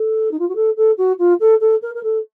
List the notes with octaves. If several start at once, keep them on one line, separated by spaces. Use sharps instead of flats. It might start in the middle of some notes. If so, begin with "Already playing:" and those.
Already playing: A4
D#4
F4
F#4
A4
A4
F#4
F4
A4
A4
A#4
A#4
A4